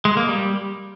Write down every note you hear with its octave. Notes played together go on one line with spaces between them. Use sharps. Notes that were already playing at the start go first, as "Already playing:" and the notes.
G#3
A#3
G3